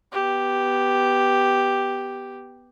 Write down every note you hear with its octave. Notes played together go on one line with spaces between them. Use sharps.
B3 G4